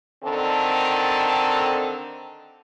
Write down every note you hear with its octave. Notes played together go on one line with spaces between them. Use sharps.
D3 D#3 C4 A4